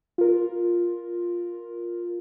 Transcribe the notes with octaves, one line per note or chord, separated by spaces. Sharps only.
F4 A#4